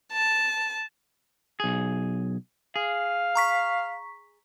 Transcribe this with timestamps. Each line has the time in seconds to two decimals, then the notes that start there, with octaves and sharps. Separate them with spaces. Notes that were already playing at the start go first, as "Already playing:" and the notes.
0.12 A5
1.60 B1 G#4
2.76 G#4 F5
3.35 A#5 C#6 B6